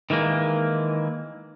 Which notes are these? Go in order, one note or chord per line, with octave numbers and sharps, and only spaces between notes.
D#3 E3 G#3 A#3